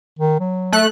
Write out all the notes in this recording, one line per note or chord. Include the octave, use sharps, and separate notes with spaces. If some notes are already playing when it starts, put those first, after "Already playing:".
D#3
F#3
A3 F#6